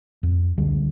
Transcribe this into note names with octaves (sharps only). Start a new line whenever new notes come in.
F2
C#2 D3 G3